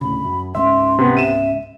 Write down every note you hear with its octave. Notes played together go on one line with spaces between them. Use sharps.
D2 A2 C#3 B5
F#2
C#2 G#2 C#4 E5 C6
C3 B3
E5 D#7 E7